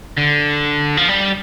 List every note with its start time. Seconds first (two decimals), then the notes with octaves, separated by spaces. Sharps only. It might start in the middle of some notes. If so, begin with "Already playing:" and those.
0.17 D3
0.97 F3
1.09 G3